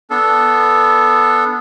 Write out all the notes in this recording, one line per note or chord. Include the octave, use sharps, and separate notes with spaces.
B3 D4 A4